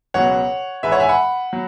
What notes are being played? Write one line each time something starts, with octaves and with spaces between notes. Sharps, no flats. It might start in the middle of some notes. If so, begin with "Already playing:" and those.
C#2 B2 F#3 C#5 F#5
G#2 E3 G#3 B4 E5
C#5 F#5
E5 G#5
F#5 B5
F#3